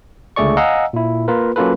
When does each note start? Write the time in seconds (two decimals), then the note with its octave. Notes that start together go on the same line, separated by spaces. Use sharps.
0.36 C#2 D3 A3 G#4 D5 C#6
0.57 D#5 F5 F#5 G#5 A#5 E6
0.93 A#2 E4
1.28 A#3 F4 A#4 B4
1.56 F#3 A#3 C#4 F4 A4 B4